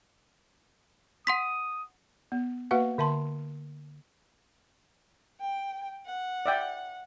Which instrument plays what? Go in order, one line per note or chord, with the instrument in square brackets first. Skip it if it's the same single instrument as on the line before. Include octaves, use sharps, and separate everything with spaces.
[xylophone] F#5 C6 B6 [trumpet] D#6
[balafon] B3
A#3 F#4 B4 F5 F#5
D3 E5 A5 C6
[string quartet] G5
F#5
[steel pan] D5 E5 G5